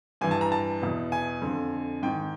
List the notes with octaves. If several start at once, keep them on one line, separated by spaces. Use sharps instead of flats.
G2 E3 G#5
A5
A#5
A5
E2 B2
G#5
F2 D3
G#2 D#3 G5